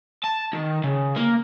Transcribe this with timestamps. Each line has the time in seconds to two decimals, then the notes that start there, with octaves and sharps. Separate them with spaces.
0.24 A5
0.53 D#3
0.84 C#3
1.17 A#3